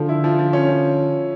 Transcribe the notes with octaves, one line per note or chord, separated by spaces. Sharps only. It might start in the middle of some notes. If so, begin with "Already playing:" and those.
Already playing: D3 F3
E4
F3
F3
C#4
F3